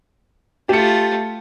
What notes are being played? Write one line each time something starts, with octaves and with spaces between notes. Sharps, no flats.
A3 F4 G4 C#7